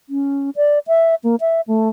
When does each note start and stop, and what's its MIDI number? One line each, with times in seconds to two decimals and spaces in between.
0.09 0.50 61
0.56 0.79 74
0.87 1.15 76
1.24 1.36 58
1.41 1.61 76
1.68 1.89 57